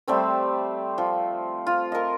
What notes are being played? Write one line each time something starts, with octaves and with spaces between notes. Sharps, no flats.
G3 A3 C4 C5
F3
F4
A#4 D#5